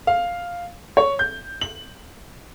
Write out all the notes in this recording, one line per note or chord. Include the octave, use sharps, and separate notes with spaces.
F5
C#5
G6
F#7